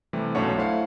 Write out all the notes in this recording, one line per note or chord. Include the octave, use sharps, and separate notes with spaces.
C3 E3 G3 A3
B1 F#2 A3 D4 C#5 F#5
A3 E4 C5 C#5 F5 F#5